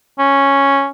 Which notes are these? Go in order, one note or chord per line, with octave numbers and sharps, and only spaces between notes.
C#4